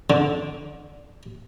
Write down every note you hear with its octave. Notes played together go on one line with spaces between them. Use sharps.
D3